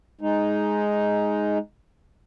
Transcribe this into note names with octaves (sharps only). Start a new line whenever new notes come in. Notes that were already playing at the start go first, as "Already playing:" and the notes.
G#3 D#4